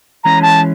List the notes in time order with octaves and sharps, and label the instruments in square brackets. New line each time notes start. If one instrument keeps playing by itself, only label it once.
[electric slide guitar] E3 G#3 C#4 [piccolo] A#5
[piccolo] A5